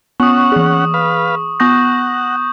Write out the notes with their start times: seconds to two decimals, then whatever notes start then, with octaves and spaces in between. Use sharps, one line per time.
0.20 B3 C#4 F#5 C#6 D#6
0.52 E3 G#4
0.94 B4 F5
1.60 B3 F#5 C#6 D#6 G6 A#6